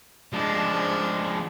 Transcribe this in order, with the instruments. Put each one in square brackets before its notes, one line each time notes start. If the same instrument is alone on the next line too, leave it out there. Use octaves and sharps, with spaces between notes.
[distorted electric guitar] F3 G#3 [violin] D4